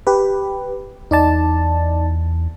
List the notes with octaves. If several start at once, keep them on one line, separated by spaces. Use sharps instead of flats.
G4 B4
E2 D#4 D5 A5